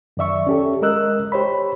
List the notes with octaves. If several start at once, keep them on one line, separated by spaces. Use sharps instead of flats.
F#2 D#3 D5 E5 C#6
C#4 G4 A4
G#3 A#4 D#5 E6 F#6
G4 C5 C#5 B5